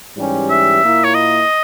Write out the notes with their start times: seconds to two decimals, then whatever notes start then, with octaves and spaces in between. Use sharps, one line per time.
0.17 G#2 E3 G3 C#4 G4
0.50 E5
0.82 A#2 A#3 E4
1.04 C#5
1.14 D#5